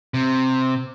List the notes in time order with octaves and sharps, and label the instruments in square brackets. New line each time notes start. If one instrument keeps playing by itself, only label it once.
[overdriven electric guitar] C3